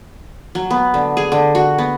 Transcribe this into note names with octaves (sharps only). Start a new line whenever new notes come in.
F#3
B3
D3
G#4
D3
F#4
B3